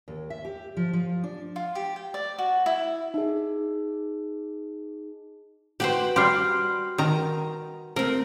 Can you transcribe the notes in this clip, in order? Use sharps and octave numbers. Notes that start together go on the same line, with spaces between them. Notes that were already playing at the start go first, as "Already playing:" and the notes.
D#2
E5
G4
F3
F3
D4
F4
G4
G5
D5
F#4
E4
D#4 G#4
F#4 G4 B4 C5 G5
G3 G4 C6 F6 C7
D#3 A#5
A3 C4 A#4